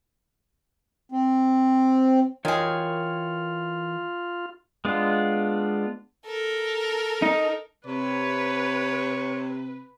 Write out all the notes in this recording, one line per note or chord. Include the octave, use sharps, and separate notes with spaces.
C4
E3 D#4 F4 G#4 A#4 C#5 G5
G#3 B3 D4 F4
A4 A#4
D#4
C3 B4 C#5